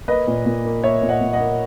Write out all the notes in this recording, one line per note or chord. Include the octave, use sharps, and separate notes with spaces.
A#3 B4 D#5
A#2
A#2
A#3
A#3 C#5 E5
A#2
D#5 F#5
A#2
D#5 F#5
A#3